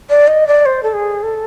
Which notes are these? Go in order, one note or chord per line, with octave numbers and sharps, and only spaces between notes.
D5
D#5
D5
C5
A4
G#4
A4